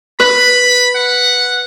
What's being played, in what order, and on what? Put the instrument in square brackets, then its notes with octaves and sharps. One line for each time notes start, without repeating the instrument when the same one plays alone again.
[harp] B4 [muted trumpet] B5
[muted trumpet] F#5